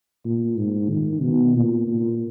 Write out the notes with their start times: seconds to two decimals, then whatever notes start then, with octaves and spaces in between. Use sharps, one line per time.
0.25 A#2
0.57 G#2
0.90 D#3
1.22 B2
1.55 A#2
1.87 A#2